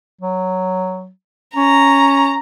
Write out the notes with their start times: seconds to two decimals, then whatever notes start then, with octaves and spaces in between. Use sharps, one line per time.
0.21 F#3
1.56 C#4 A#5